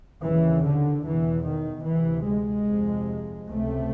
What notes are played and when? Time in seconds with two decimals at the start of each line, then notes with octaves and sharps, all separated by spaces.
0.22 D#2 C#3 E3
0.64 D3
1.04 E2 B2 E3
1.45 D#3
1.86 D2 C3 E3
2.26 G#3
2.67 F2 C3
3.49 C#2 C3 A3